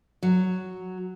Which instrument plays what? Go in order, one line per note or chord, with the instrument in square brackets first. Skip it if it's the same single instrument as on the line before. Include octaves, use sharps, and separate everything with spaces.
[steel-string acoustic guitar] F#3